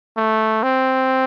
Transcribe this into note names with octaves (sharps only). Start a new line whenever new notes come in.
A3
C4